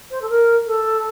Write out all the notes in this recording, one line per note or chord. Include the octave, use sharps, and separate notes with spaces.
C5
A4
A#4
A4